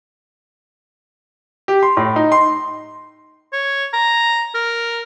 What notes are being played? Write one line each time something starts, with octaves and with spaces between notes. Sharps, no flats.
G4
C6
A2
D#4
C6
C#5
A#5
A#4